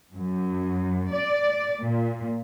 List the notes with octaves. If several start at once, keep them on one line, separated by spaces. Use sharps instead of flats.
F#2
D5
A#2